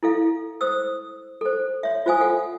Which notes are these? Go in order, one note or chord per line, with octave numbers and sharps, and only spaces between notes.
E4 A4 F5
C5 D#6 E6
A4 C5
C#5 E5
F4 C5 F5 G#5 D#6
A4 F#5